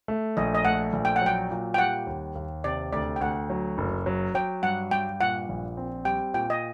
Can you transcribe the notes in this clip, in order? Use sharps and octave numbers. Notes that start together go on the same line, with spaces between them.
A3
A#1 D#5
D#5
A3 F#5
A#1
G5
F#5
F#3 G5
A#2
G5
G3 F#5
D#2
D#2
C3 D5
D2 D5
G5
D2 F#5
F#3
F#1
F#3
F#3 G5
G2 F#5
G2 G5
A#2 F#5
A#1
C4
G3 G5
A#2 G5
D#5